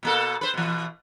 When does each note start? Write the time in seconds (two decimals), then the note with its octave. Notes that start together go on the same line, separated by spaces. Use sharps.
0.03 B2 A#3 A4
0.41 B4 C5
0.54 B2 E3